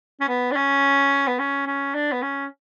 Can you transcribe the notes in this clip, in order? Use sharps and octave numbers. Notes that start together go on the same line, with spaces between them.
C#4
B3
D4
C#4
B3
C#4
C#4
D4
B3
C#4